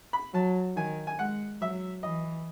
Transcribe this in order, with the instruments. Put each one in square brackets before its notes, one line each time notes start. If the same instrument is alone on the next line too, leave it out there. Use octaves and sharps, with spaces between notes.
[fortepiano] B5
[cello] F#3 [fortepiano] A5
[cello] D#3 [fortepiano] G#5
[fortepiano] G#5
[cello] G#3 [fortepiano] F#5
[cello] F#3 [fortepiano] E5
[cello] E3 [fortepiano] D#5